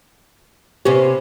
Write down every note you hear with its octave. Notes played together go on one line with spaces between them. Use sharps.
C3 B3 C#4 G4